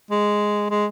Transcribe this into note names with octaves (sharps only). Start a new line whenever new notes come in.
G#3
G#3